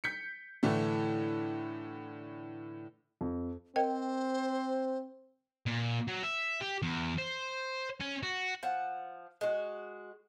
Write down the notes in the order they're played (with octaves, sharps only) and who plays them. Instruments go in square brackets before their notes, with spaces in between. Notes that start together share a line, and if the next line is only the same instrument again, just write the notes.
[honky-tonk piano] G6 B6 C#7
A2 D3 E3 A3
[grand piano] F2
[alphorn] C4 [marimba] A#4 D#5 G5 [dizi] C5
[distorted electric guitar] A#2
F#3
E5
G4
E2
C5
C#4
F#4
[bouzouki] F3 F#5
G#3 F#4